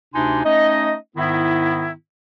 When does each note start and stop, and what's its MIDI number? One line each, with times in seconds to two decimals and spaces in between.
0.13 0.39 38
0.13 0.39 48
0.13 0.39 62
0.13 0.39 63
0.13 0.39 80
0.13 0.39 84
0.44 0.94 57
0.44 0.94 61
0.44 0.94 63
0.44 0.94 75
1.16 1.91 44
1.16 1.91 51
1.16 1.91 59
1.16 1.91 64